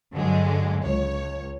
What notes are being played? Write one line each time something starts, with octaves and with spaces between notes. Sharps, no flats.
G2 D3 F#3 G#3
C#2 C#5